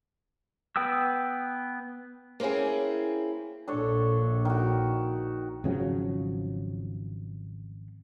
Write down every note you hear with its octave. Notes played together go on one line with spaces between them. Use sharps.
B3 B4 G5 D#6 E6
A#3 C4 C#4 E4 G#4
A#1 D4 A4 C#5
D#3 F#4
G#1 C#3 F3 F#3